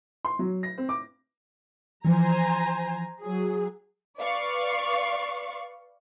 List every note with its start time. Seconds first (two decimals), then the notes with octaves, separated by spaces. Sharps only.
0.25 C6
0.39 F#3
0.63 A#6
0.78 C4
0.89 D6
2.05 E3 F3 C5 G#5 A#5
3.23 F#3 G#4
4.20 B4 D5 F5 C#6